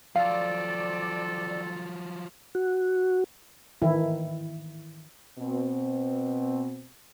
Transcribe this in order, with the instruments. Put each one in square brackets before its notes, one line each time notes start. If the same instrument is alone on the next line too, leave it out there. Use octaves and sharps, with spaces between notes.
[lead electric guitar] F3 F#3 [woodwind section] C4 F4 A4 [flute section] D5 [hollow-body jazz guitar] F5
[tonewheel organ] F#4
[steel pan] D#3 E3 E4
[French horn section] B2 C4